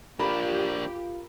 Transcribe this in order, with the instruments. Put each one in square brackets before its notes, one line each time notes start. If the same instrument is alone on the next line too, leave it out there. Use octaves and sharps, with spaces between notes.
[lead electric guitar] A#3 D4 [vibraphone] F4 F5 [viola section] G4 [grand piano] A#4 B5